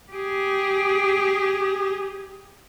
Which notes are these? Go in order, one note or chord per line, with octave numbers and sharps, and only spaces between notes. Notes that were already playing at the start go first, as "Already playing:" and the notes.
G4 G#4